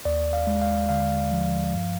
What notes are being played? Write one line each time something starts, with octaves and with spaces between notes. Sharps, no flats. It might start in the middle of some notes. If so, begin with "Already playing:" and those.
D#2 D5
F5
G#3
F5
D3 F5
F3
G2